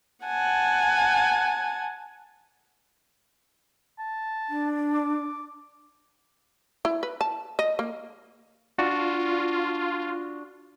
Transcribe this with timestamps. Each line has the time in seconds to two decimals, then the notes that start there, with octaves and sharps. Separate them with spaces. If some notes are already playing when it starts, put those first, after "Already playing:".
0.25 F#5 G#5 A5
3.99 A5
4.49 D4
4.94 D6
6.85 E4
7.03 B4
7.21 A5
7.59 D#5
7.79 A#3
8.78 D4 F4 F#4